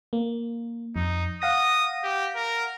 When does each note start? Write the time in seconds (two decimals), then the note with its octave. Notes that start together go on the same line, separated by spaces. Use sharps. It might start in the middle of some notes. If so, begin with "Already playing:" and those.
0.13 A#3
0.96 F2 D#4
1.42 F5 F#5 D#6 A#6
2.03 G4
2.36 A#4